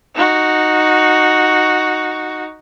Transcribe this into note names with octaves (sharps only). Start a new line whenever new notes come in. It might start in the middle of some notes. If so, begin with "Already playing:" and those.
D#4 F#4